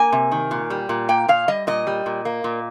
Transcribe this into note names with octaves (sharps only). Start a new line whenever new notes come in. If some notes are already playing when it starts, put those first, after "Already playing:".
Already playing: A#3 G#5
C3
D#3
A#2
G3
A#2
A#3 G5
A#2 F5
G3 D#5
A#2 D#5
G3
A#2
A#3
A#2